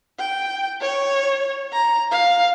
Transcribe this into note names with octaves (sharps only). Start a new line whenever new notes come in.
G5
C#5
A#5
F5